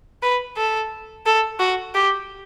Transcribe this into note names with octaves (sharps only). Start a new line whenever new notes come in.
B4
A4
A4
F#4
G4